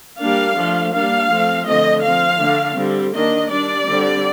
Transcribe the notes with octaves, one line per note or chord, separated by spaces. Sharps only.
G3 A#3 D4 F5
F3 A3 D4
G3 A#3 D4 F5
F3 A3 C4
D3 F3 A3 C4 D#5
F3 C4 F5
D3 A3 D4
D3 G3 C4
D#3 A#3 D4 D#5
G3 D4 D5
D3 G3 C4